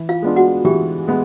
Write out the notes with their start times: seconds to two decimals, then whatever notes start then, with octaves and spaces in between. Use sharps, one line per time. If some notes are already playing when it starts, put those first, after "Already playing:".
Already playing: E3
0.09 F4 F5
0.22 G#3 B3 D4 F4
0.36 F#4 F#5
0.65 E3 G4 G5
1.08 G#3 B3